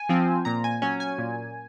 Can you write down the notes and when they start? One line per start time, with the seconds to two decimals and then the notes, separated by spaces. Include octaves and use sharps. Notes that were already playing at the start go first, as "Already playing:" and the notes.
Already playing: G#5
0.09 F3 C4
0.45 A#2 A#5
0.64 G#5
0.82 F#3 C#4 G#5
1.00 G#5
1.18 A#2